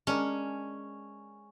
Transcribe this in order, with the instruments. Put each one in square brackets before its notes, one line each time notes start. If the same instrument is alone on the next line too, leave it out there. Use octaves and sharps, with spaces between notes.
[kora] G#3 D4 A#4 [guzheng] C#4